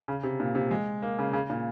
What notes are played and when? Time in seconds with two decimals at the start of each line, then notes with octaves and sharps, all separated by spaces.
0.08 C#3
0.23 C3
0.40 A#2
0.55 C3
0.71 G#3
1.02 A#3
1.19 C#3
1.33 C#3
1.50 A#2